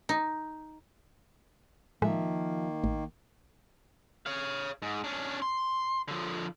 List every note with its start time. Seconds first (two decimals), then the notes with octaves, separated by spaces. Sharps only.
0.09 D#4
2.02 A2 D#3 F3 G#3 A#3 E5
2.84 A1
4.26 C#5 F5
4.82 G#2
5.04 C#4 D4
5.42 C6
6.08 D3 F3